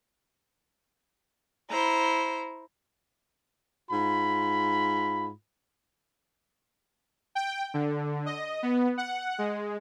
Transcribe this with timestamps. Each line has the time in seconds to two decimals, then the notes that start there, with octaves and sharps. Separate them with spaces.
1.70 E4 C5 A#5
3.92 G#2 F4 B5
7.35 G5
7.74 D3
8.26 D#5
8.63 B3
8.98 F#5
9.38 G#3